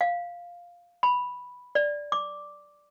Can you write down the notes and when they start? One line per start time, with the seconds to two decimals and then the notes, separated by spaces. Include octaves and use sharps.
0.01 F5
1.03 B5
1.75 D5
2.12 D6